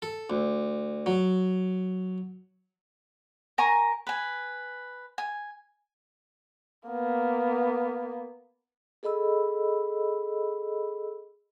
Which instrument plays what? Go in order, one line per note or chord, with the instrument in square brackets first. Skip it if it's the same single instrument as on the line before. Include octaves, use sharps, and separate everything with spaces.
[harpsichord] A4
D2
F#3
[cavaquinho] A#4 G#5 A#5 C#6
B4 G#5
G#5
[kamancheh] A#3 B3
[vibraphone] G#4 A4 D#5 B5 E6